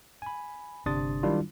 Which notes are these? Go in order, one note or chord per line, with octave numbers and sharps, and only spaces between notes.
G#5 B5
G1 C3 D4 C6 D#6 A6
D#3 F#3 G3 D4 E4 F4